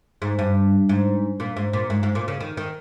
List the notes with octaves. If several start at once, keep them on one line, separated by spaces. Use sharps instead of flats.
G#2
G2
G#2
A#2
G#2
A#2
G#2
G#2
A#2
C#3
D#3
D#3